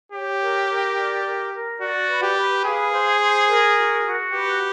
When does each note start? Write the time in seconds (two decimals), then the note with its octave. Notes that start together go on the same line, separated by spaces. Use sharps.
0.12 G4 C#5
0.41 A#4
0.68 A#4
0.97 D5
1.25 A#4
1.52 A#4
1.81 F#4 D5
2.08 B4
2.22 G4
2.36 B4
2.64 G#4 F5
2.93 C5
3.20 C5
3.49 A#4
3.76 F#4
4.04 F#4
4.32 G4 B4